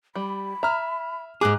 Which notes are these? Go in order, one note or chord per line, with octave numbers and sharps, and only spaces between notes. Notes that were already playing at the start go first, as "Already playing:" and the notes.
G3 B5
E5 A#5 F6
G#2 G#4 D6 F#6